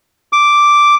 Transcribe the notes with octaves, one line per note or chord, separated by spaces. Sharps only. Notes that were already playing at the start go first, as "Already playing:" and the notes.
D6